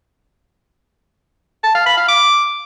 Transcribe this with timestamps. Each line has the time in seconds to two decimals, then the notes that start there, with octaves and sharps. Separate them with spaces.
1.63 A5
1.75 F5
1.86 B5
1.97 F5
2.08 D6